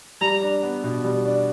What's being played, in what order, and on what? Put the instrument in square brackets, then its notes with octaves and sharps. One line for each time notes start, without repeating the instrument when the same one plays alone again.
[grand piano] G3 [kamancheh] A#5
[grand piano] D4
B3
B2
G3
D4